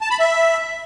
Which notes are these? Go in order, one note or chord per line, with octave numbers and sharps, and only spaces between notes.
A5
B5
E5